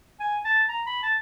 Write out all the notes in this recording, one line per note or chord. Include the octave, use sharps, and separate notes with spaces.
G#5
A5
A#5
B5
A5